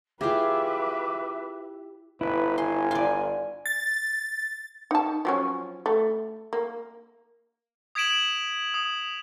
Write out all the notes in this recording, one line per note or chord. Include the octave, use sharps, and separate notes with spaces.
E4 F4 G4 G#4 B4 E5 D6 E7
G1 E4 B4
G#5 C6
F4 D5
A6
D#4 A5
F3 F#3 C#4
A3
A#3
D#6 G#6 B6 D7 E7 F#7
D#6